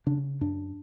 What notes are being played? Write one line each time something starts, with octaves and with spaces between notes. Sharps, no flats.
C#3 D4
F#2 D4